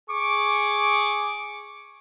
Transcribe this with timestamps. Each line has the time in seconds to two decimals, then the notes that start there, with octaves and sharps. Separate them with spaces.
0.10 G#4 C#6 D6